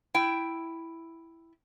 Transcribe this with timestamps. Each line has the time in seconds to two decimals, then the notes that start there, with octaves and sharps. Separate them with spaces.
0.14 E4 G5